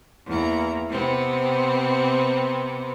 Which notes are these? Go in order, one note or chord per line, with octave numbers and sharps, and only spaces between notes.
E2 A#3 E4 A#5
C3 B3 C4